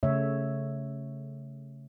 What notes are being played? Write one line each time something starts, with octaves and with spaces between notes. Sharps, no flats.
C#3 A3 C#5 E5